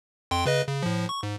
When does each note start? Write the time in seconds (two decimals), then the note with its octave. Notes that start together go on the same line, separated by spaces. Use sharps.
0.31 F2 G5 C6
0.46 C#3 B4 D#5
0.68 C#3
0.83 A2 F3
1.09 C#6
1.23 G#2